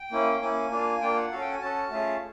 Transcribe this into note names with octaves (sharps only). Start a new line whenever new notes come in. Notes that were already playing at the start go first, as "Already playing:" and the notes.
Already playing: G5
A#3 C#4 E4
A#3 C#4 E4 G#5
A#3 D4 F4
A#3 D4 F4 G5
F#5
C#4 F#4 A4 F5
G5
G#5
C#4 F#4 A4 A5
A3 C#4 F4 G#4